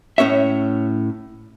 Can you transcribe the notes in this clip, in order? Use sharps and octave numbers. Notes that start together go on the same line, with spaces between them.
A2 C#4 C#5 E5